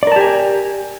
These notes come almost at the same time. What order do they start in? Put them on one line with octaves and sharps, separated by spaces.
D5 A#4 A5 G4 G#5